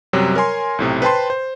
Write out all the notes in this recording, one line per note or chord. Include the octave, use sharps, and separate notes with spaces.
F#2 C3 F#3 G3
A#4 C#5 G#5 C6
B1 A2 C3
B4 C5 G5 A5 C6
C5